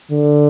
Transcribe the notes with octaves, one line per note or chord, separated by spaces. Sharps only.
D3